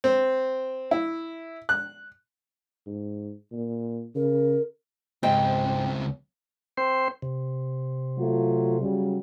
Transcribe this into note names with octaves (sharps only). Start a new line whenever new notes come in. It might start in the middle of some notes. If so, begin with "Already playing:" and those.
C4
E4
F#6
G#2
A#2
C#3 A#4
C#2 G#2 C4 G5
C4 C5
C3
F#3 A3 F4
C#3 F#3 G3